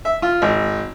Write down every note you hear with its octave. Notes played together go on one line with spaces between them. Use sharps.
E5
F4
G#1